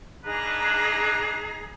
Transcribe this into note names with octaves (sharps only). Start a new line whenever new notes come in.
A#3 D4 D#4 G#4 B4 A#5